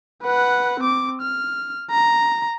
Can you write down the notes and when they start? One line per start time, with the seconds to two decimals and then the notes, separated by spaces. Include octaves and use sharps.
0.22 B4 F#5
0.80 C4 D6
1.22 F6
1.91 A#5